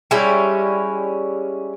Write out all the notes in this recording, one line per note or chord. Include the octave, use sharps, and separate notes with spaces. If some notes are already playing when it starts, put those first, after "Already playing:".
G3 G#3 C#4 E4